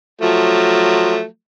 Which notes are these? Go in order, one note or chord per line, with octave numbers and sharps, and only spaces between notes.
F3 F#3 A3